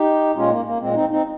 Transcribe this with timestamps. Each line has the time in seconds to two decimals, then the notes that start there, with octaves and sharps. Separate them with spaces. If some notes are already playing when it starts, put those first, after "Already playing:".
Already playing: D#4 G4
0.36 A#2 G#3 C#4 F4
0.50 A#3
0.65 A#3
0.80 A#2 G#3 C4
0.94 C4 D#4
1.09 C4 D#4